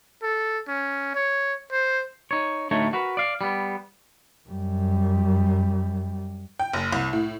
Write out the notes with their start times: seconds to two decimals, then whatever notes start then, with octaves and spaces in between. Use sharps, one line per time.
0.23 A4
0.68 C#4
1.15 C#5
1.72 C5
2.31 D#4 C#5
2.71 D2 A2 A3 D#4 C#5
2.93 F#4 A#4 B4
3.17 D5 F5
3.41 G3 B3
4.49 F#2 G3
6.60 G5
6.74 F#1
6.93 C2
7.13 A2